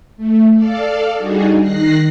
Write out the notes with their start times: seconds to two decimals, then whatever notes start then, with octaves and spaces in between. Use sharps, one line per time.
0.16 A3
0.53 A4 D5 F5
1.17 G3 D4 D#4 F#4 G#4
1.60 D#3 F#6 A#6 C7